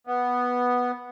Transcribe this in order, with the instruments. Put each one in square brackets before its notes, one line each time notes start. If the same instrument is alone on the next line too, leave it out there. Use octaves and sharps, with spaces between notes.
[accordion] B3